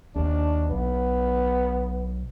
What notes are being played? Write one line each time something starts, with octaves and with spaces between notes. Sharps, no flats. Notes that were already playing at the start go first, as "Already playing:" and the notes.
D#2 D4
B1 B3